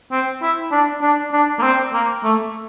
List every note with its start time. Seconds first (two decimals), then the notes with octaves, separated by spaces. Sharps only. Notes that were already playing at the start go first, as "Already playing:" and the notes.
0.11 C4
0.42 E4
0.72 D4
1.02 D4
1.33 D4
1.59 A#3
1.63 C4
1.93 A#3
2.24 A3